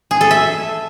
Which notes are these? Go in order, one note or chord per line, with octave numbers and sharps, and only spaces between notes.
G#4
A4
E5